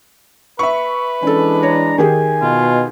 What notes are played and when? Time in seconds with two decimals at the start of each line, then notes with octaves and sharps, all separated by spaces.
0.59 B4 E5 C#6
1.23 E3 G#3 C#4 D4 A4
1.63 C#5 A#5
1.98 D#3 G4 G#4 G#5
2.42 B2 F4